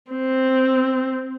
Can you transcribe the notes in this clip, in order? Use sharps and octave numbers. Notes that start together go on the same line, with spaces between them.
C4